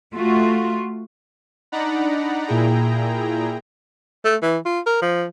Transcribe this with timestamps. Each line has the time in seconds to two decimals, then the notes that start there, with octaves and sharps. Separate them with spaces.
0.15 A3 F4 F#4
1.72 D4 D#4 D5 F#5 A#5 B5
2.46 A#2 E4 G#4 G5 A#5
4.25 A3
4.42 E3
4.65 F4
4.86 A#4
5.02 F3